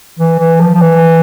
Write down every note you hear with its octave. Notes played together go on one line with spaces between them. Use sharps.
E3
E3
F3
F3
E3